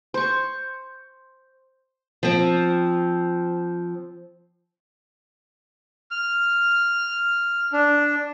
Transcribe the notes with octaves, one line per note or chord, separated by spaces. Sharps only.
C5 C#6
F3 C4
F6
D4